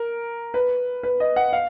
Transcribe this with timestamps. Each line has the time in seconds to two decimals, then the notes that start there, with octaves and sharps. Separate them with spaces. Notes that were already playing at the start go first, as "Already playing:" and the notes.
Already playing: A#4
0.54 B4
1.03 B4
1.20 D#5
1.36 F#5
1.53 F5